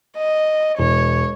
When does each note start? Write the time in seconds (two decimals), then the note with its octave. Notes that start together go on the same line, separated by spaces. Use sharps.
0.17 D#5
0.79 E1 C#5